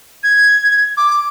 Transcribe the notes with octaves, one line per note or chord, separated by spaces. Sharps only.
G#6
D6